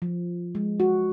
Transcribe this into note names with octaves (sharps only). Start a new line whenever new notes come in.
F3
G#3
F#4